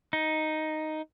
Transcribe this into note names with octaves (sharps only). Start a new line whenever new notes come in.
D#4